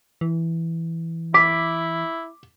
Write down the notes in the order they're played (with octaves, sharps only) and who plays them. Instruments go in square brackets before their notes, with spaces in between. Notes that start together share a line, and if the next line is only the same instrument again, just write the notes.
[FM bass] E3
[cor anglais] E4 [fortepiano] D6 [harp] B6